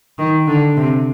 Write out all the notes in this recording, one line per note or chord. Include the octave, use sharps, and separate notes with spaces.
D#3
D3
C3